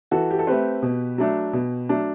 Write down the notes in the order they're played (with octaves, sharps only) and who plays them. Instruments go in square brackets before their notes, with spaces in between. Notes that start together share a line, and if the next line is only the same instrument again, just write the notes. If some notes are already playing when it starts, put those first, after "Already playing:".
[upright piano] E3 F#4 A4
G4
A4
A3 C4 G4 B4
B2
F#3 A3 D4
B2
F#3 A3 D4